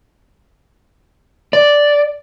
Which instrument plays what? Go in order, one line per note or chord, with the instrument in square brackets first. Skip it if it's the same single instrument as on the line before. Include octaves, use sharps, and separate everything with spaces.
[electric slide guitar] D5